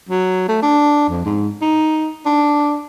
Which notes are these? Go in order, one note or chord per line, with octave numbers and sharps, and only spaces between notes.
F#3
A3
D4
F2
G#2
D#4
D4